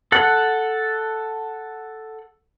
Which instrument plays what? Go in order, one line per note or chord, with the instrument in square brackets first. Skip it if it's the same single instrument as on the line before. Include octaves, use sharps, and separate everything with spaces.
[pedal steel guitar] A4 F#5